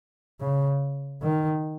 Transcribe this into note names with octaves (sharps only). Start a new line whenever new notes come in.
C#3
D#3